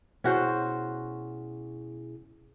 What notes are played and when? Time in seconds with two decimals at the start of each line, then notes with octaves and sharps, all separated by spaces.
0.24 B2 C#4 E4 F#4 G#4 C5